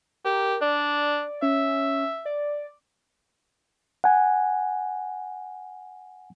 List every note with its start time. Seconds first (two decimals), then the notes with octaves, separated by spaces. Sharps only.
0.25 G4 A#4
0.61 D4 D5
1.42 C#4 E5
2.25 D5
4.04 F#5 G#5